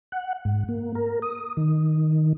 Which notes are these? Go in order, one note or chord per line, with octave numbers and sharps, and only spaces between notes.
F#5
G#2
A#3
A#4
D#6
D#3